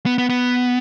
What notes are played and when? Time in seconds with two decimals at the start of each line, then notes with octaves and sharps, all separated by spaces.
0.06 B3
0.18 B3
0.29 B3